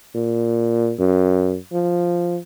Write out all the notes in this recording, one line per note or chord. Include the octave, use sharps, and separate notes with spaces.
A#2
F#2
F3